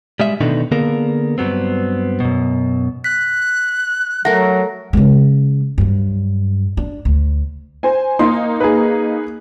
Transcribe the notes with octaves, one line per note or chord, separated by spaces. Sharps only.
G3 G#3 E5
B2 D3 D#3 A3 D4 D#4
D3 A#3 B3 G#4 A#4
G2 F#3 B3 C4
F#2 B2
F#6 B6
F#3 A3 A#4 F#5 A#6
C#3 G#3
G2 F#3
D4
D2
C5 G#5
A#3 D#4 C6
G#4 B4